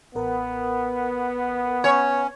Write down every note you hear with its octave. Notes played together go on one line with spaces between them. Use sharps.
A1 B3 A#4
C#4 C#5